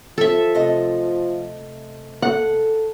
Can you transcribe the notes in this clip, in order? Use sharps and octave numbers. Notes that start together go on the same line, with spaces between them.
F3 A4 E5
C3 A3 D#5
A4 F#5